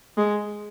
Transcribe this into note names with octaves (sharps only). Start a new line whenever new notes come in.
G#3